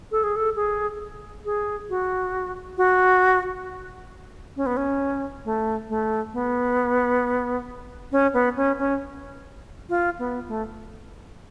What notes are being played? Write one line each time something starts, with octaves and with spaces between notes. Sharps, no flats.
A4
G#4
A4
G#4
G#4
F#4
F#4
C#4
B3
C#4
A3
A3
B3
C#4
B3
C#4
C#4
F4
B3
A3